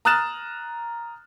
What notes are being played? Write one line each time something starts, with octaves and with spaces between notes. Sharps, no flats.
A#5 D#6 F6 F#6 A6 E7